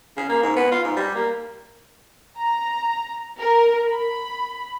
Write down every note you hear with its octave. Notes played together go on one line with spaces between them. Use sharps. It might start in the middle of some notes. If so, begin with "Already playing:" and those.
C#3
A#3
G#2
B3
F4
G#2
G3
A#3
A#5
A#4
B5